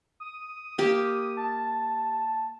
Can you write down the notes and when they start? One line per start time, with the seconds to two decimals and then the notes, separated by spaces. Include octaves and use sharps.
0.20 D#6
0.78 A#3 G4
1.37 A5